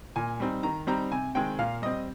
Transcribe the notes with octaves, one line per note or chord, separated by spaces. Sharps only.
A#2 G#5
G3 C4 D#4
D#3 A#5
G3 C4 D#4 A#5
C3 G#5
D#3 G#3 C4 G5
A#2 F5
G3 C4 D#5